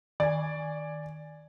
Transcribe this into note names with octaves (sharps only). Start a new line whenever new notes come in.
D#3 D5 G#5